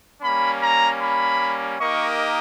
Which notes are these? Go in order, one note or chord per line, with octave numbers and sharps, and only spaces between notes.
G3 A#3 C#4 B5
A#5
B5
A#3 D#4 G4 A#4 D#5 C#6